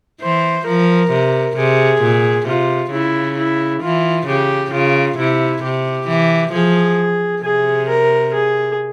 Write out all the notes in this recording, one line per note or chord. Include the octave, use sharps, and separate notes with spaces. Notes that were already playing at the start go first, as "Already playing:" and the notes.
E3 C5
F3 A#4
C3
C3 G#4
A#2
C3 F4
C#3 E4
E4
E3 F4
C#3 G4
C#3 F4
C3 E4
C3 G4
E3
F3 G#4
C3 G#4
A#4
G#4